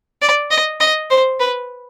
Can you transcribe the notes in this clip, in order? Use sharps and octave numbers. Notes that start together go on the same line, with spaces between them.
D5
D#5
D#5
C5
B4